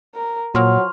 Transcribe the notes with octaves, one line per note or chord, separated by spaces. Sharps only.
A#4
A#2 F3 F#3 C6 C#6 F6